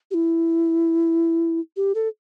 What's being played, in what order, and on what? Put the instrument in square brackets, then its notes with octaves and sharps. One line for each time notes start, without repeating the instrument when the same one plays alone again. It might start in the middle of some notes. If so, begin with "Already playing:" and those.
[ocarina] G4
E4
G4
A4